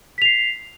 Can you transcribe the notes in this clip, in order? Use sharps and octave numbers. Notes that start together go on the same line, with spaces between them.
B6 C7 F7